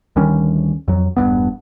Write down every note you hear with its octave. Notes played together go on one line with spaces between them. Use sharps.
D2 D#3 G3 C#4
F2 F#3
E1 E2 G2 B3